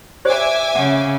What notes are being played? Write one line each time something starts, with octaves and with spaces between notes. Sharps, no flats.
G4 C5 D5 E5 G#5 D6
C#3 F#5